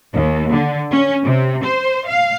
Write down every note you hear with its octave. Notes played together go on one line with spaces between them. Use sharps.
D#2
D3
C#4
C3
C5
F5